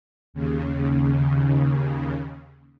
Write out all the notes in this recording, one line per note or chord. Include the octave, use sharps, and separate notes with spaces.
D#2 C#3